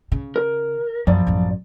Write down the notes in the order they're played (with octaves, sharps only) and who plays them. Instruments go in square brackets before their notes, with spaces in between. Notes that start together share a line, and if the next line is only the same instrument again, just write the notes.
[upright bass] C#3
[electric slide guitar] A#4
[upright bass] F#2 [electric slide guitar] F3 D5
[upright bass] A1 F#2